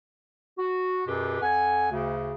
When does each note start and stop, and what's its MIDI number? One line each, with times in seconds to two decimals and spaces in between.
0.59 1.03 66
1.07 1.40 42
1.07 1.40 47
1.07 1.40 67
1.07 1.40 68
1.07 1.40 71
1.42 1.88 41
1.42 1.88 78
1.42 1.88 80
1.92 2.34 38
1.92 2.34 49